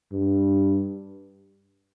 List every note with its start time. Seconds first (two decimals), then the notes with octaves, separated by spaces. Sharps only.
0.13 G2